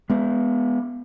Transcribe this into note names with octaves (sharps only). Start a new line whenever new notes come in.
G#3 B3